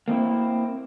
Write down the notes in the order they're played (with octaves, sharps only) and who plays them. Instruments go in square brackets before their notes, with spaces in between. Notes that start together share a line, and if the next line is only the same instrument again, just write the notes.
[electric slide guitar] A#3 C4 E4